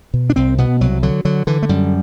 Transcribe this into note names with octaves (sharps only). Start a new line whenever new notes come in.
B2
D4
C2 C4
B2 B3
C2 F#3
D3 F#3
D3 F#3
D3 E3
A3
F#2 G3